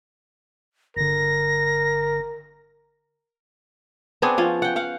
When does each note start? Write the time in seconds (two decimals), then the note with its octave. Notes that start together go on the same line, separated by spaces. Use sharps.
0.97 G1 D3 A#4 A#6
4.22 B3 C4 D4 G#4
4.38 F3 C#4
4.62 F#5 G5
4.76 F5 F#5